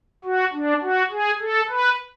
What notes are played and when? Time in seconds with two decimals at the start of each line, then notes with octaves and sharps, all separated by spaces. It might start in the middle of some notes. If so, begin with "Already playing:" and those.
0.24 F#4
0.53 D4
0.82 F#4
1.11 G#4
1.41 A4
1.69 B4